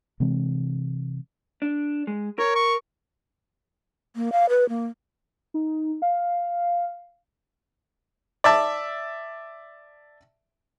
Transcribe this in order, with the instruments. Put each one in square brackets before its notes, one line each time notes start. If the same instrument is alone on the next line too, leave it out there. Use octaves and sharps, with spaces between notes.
[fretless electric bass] C3 E3 G#3 C4
[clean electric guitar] D4
G#3
[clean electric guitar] A#4 [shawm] C#5
[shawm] C#6
[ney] A#3
F5
B4
A#3
[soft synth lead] D#4
F5
[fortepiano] D5 E5 A5